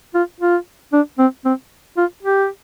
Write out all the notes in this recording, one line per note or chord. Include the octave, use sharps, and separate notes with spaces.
F4
F4
D4
C4
C4
F4
G4